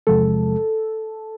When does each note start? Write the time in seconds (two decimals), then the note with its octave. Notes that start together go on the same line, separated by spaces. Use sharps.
0.07 E2 C3 F3 G#3 A4